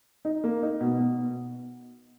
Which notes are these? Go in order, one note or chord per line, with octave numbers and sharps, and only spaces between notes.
D#4
A#3
D#4
B2
B2